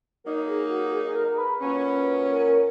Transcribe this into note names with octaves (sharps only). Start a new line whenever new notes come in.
F#3 A#3 D#4 A#4
G#4
F#4
G#4
G#4
A#4
A#4
B4
A#2 F#3 C#4 B4
A#4
A#4